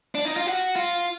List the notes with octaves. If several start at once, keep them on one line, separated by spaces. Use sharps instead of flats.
D4
D#4
F4
F#4
F4